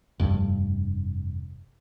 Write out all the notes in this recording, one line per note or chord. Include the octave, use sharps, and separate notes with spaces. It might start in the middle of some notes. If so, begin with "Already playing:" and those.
F1 G2